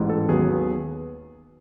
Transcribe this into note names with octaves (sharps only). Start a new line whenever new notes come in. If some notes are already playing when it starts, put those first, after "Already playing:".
Already playing: A1 G#2 E3
A4
D#2 D#3 F#3 B3 G#4